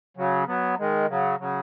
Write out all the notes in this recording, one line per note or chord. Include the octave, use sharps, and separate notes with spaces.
C#3 F#3
F#3 B3
D#3 G#3
C#3 F#3
C#3 F#3